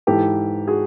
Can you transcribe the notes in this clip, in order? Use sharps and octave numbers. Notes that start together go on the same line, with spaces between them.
G#2 E3 G4 A4
F#4 G#4